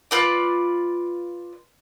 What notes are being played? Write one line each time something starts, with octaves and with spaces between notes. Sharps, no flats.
F4 B4 D5